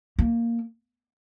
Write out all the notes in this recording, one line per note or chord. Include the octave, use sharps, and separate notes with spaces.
A#3